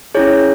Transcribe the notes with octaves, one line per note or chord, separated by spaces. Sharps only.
C#4 E4 G#4 C#5